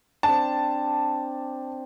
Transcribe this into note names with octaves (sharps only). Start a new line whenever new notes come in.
C4 D4 A5